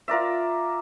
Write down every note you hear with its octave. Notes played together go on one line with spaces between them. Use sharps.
F4 A#4 D5 E5